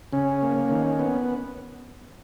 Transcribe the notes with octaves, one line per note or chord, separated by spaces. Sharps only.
C#3 C#4
A#3
D#3
B3